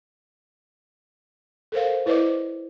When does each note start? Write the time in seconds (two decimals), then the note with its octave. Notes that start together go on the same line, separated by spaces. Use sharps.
1.72 A4 A#4 C5 F5
2.06 E4 B4 C5 D5 D#5 D6